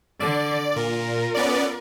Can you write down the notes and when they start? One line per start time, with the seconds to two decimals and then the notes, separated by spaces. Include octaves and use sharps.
0.20 D3 D5
0.76 A#2 F4 A#4
1.34 B3 C#4 D5